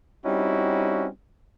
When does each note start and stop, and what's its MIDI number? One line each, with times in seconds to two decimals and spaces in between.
0.25 1.07 55
0.25 1.07 60
0.25 1.07 61
0.25 1.07 63
0.25 1.07 64
0.25 1.07 66